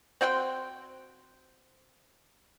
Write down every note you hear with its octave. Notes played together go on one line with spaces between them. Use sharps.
C4 F#4 G5 C6